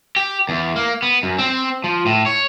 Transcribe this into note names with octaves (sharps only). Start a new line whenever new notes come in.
G4
E2
A#3
B3
F#2
C4
F3
A2
C#5